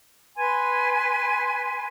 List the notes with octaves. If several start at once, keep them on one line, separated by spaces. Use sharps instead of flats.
B4 G#5 C6